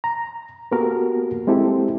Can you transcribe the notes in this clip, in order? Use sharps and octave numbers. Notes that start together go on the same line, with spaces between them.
A#5
A#3 B3 F#4 G4 A4 A#4
G#3 C4 E4 G4 A4